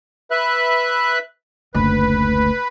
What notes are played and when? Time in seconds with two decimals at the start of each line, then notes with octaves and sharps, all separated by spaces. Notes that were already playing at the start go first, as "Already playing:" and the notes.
0.31 B4 E5 F#6
1.74 F#1 D2 B4